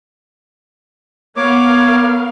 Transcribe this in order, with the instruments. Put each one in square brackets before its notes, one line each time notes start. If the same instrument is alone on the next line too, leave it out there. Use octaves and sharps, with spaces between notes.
[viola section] B3 A#4 F5 [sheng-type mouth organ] C#5 D6